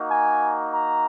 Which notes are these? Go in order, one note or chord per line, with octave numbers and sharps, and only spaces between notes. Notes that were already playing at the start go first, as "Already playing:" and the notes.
Already playing: A#3 D#4 F#4
G#5
A#5